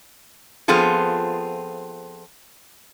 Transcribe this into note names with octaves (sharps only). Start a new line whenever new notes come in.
F3 B3 C4 F4 G#4 A4